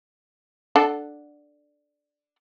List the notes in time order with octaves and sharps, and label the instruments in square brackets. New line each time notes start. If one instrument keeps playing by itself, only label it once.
[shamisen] D4 A4 F#5